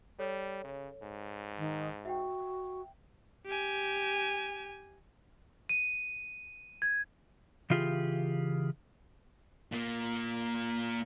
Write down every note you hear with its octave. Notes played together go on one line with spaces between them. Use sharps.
G3 A4 C#5
C#3
G#2
D#3
F#4 E5 F#5 G5
G4 G#5
D#7
G#6
C#3 E3 F4 G4 G#4
A#2 A#3